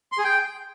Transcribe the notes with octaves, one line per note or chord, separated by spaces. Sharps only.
C6
G#4
G5